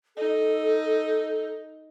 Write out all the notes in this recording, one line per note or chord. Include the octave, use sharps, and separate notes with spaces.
D#4 A4